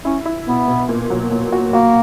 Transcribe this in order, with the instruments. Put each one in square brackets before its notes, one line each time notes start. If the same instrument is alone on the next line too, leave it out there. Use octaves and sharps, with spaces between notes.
[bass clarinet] C#4 [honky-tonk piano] E4
[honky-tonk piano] E4
[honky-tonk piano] B2 [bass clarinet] B3
[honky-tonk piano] B2
A#2
F#3
A#2
F#4
[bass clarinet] A#3 [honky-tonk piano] F#4